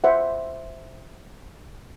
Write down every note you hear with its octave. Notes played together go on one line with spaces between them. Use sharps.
C5 E5 F#5